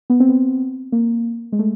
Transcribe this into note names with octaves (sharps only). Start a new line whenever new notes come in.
B3
C4
B3
A#3
G#3
A3